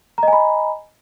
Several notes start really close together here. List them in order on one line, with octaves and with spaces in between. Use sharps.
A#5 D#5 G#5 B5